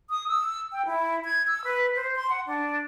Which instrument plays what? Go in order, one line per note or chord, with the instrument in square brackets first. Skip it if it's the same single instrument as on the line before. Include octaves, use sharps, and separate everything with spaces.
[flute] D#6
E6
G5
E4
G#6
E6
B4
C5
C6
F#5
D4